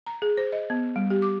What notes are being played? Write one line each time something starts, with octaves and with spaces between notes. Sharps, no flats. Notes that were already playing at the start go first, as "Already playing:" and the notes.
A#5
G#4
C5
D#5
B3
G3
G4
D6